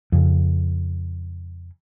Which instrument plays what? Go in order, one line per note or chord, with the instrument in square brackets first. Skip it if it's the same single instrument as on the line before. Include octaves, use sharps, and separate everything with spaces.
[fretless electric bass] F2 C#3